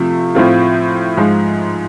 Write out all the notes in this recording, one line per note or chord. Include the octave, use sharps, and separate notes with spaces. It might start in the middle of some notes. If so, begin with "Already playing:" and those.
Already playing: C3 F3 A3
A2 F3 A3 C4 F4
G#2 F3 G#3